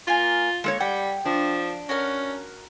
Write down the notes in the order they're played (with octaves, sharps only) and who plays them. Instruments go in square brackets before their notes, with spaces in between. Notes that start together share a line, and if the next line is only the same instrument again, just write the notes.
[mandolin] A#3 A#4 G#5 [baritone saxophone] F4
[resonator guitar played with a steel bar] G#3 A4 C#5 [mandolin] A#3
[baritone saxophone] G3 [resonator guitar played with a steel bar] F#5 [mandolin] G5
[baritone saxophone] F3 [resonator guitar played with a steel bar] D4
[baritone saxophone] C#4 [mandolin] F#4 A#4 F6